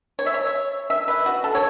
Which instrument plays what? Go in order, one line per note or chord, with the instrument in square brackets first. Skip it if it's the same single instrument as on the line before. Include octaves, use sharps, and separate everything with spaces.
[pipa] C#5
E5
C#5
E5
B4
F#4
A4
C#5